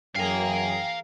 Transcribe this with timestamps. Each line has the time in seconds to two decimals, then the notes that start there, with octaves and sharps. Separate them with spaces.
0.16 F#2 E3 G#4 A#4 F5 G5 A#5